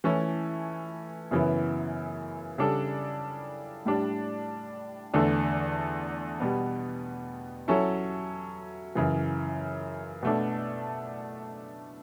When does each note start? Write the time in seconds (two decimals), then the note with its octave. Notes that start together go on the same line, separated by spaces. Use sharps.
0.04 E3 A3 C#4 E4
1.31 F#2 C#3 E3 B3 E4
2.58 C#3 G3 D4 A4
3.85 A2 G3 D4
5.14 E2 D3 A3 D4
6.40 B2 G3 B3
7.68 F#3 C#4 E4 A4
8.95 F#2 C#3 E3
10.23 B2 A3 D4